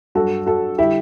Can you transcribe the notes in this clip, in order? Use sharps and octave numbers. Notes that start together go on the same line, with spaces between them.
G2 F#3 F#4 A4
F#4 A4
D3 G3 E4 G4